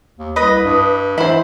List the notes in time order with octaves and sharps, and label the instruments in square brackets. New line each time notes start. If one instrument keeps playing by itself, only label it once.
[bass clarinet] D#2
[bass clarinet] C2 [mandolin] B4 D#5 B5
[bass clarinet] G2
[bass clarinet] E3 [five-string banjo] E4 C5 [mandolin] B5